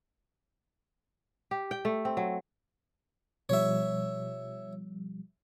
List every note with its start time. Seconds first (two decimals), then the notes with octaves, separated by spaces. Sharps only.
1.51 G4
1.71 G5
1.85 A3
2.05 C4
2.17 F#3
3.49 B2 F3 G3 C#5 E5